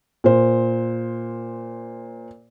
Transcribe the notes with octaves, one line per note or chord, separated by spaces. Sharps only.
A#2 C5